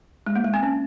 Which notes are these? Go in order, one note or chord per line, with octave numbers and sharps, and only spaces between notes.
G#3
A#3
G#3
C4
C#4